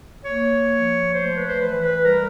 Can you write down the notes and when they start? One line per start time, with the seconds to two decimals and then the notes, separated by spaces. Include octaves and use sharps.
0.24 A#3 C#5
0.69 F3
1.14 A3 C5
1.36 B4
1.48 C5
1.59 E3 B4
1.81 B4
2.04 G3 A#4